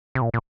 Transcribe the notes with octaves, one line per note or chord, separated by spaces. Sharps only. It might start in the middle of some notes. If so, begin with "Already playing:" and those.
C3
A#2
A#2